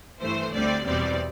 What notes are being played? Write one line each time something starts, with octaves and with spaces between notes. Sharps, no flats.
G2 E3 A3 C5
D2 D3 G3 C4 D5
E2 B2 G3 C4 D5